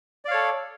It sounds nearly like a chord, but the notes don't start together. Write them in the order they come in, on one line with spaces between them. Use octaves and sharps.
D5 F5 C#5 A4